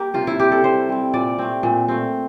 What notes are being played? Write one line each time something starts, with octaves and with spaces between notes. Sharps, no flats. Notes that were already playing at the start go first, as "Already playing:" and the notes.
Already playing: A#3 G4
C3 F4
E4
G3 C4 G4
A4
C3 C5
G3 C4
A#2 D5
A3 C4
A#2
A3 C4